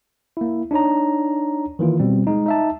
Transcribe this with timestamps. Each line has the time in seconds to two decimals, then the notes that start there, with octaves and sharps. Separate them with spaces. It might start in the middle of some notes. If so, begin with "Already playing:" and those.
0.37 A#3 E4
0.71 D4 D#4 C#5 A#5
1.79 D#3 E3 A#3 F4
2.00 B2 G3 C4
2.27 G#3 D#4
2.46 D#4 E5 A5